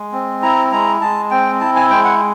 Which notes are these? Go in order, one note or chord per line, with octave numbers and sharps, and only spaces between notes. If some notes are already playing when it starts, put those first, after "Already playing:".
Already playing: G#3
C4
E4 A#5
G#3 A#5
G#3 A5
C4 G5
E4 A5
G#5
G#3 G5
F#5